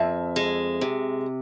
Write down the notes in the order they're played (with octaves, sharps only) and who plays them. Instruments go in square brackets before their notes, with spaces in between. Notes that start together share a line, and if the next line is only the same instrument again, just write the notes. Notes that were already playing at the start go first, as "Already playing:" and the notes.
Already playing: [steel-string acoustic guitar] F2 [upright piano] E5
[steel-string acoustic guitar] G#3
C3